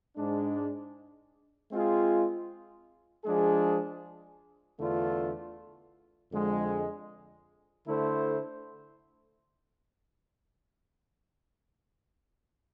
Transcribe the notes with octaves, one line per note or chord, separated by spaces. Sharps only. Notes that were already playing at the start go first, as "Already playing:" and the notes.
G#2 G#3 D4
G#3 C4 F4 G#4
F3 G#3 D4 G#4
E2 D3 A3 D4 F4
F2 D3 G#3
D3 A3 E4 A4 C5